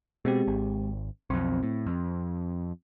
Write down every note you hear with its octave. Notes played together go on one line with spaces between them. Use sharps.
B2 G#3 C4 G4
G#1
B1 F2 C4
A2
F2